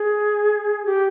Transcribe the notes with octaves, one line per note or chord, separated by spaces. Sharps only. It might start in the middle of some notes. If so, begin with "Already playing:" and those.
Already playing: G#4
G4